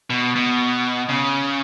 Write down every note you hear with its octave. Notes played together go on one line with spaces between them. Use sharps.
B2
B2
C#3